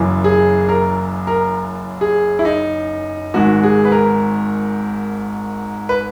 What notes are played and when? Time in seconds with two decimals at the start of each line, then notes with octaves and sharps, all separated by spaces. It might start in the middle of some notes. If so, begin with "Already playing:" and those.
Already playing: F#1 F#2 E3
0.24 G#4
0.69 A#4
1.27 A#4
2.01 G#4
2.39 E4
2.45 D#4
3.34 G#1 G#2 D#3 F#4
3.63 G#4
3.85 B4
3.92 A#4
5.89 B4